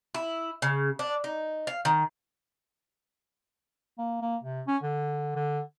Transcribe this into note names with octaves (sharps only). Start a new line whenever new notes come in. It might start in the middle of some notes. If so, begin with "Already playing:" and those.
E4
C#3
D4
D#4
F5
D#3
A#3
A#3
C3
C#4
D3
D3